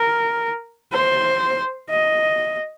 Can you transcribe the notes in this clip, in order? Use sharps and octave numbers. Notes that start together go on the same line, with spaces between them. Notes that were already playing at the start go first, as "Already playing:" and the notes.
Already playing: A#4
C5
D#5